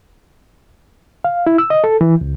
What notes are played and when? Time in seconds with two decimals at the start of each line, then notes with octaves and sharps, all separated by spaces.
1.24 F5
1.47 E4
1.58 E6
1.70 D#5
1.84 A4
2.01 E3
2.21 C#2